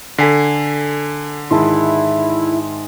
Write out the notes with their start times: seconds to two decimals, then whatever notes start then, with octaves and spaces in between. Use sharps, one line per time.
0.18 D3 A4 G#5 B6 C7
1.51 G#2 D#3 G#3 E4 E5 A5 C6